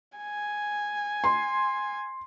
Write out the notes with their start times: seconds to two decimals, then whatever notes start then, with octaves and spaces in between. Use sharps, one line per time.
0.18 G#5
1.24 C6